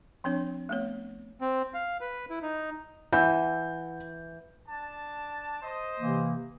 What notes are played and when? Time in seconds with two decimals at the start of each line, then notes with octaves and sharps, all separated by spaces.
0.24 F3 C4 D4 C#5
0.69 A3 B3 C#5
1.41 C4
1.74 F5
2.01 B4
2.30 E4
2.42 D#4
3.12 E3 E5 F#5 G6
4.67 D4 A5
5.62 C5 D#5
6.00 C3 E3 A#3